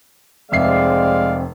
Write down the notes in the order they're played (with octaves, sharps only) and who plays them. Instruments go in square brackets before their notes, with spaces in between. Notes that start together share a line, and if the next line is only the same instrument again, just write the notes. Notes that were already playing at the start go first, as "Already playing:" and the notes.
[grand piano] F1 E5 C7 [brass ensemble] G#3 D5 F5 [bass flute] C4